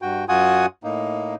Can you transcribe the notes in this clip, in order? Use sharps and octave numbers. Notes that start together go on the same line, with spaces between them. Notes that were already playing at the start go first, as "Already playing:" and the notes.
G2 F#4 G5
F#2 F4 F#4 F#5 G#5 D#6
A2 A#3 D#4